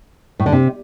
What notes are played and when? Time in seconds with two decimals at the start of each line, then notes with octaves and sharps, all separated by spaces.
0.40 A2
0.46 D3
0.52 C3